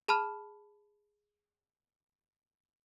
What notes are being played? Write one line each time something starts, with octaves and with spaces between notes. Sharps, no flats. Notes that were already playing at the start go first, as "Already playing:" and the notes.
G#4 A5 B5 F6